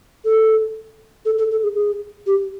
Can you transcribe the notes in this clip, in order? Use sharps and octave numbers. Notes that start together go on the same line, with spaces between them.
A4
A4
A4
A4
G#4
G#4
G4